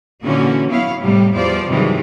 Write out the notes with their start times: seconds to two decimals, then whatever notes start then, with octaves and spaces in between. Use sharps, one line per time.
0.24 A#2 D3 E3 C#4 F#4
0.69 F#3 B3 E4 C#5 F5
1.00 A2 C3 G3
1.34 E2 F3 G3 F4 C5 D5
1.68 G2 C3 D#3 E3 F#3 G#3